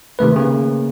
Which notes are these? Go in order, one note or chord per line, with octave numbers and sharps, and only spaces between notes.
C3 D#3 A3 B4
C#3 A#3